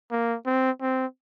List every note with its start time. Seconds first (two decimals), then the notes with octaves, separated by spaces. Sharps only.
0.11 A#3
0.46 C4
0.81 C4